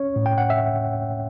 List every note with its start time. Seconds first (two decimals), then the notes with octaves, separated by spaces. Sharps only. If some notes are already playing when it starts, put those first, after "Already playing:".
Already playing: C#4 C#5
0.16 A2
0.26 G5
0.38 F#5
0.50 E5